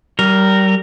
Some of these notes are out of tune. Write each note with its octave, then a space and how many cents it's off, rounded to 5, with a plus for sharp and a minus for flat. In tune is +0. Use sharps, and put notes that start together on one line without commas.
G3 -30 A#4 -5